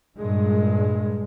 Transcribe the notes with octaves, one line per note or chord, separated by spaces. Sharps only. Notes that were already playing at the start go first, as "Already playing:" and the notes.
G2 A#2 G#3